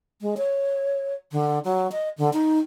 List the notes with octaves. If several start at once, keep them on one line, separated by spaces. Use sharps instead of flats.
G#3
C#5
D3
F#3
D#5
D3
D#4